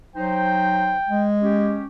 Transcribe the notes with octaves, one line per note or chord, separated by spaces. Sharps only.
F#3 D#4 C5 G5
G#3
C#4 G4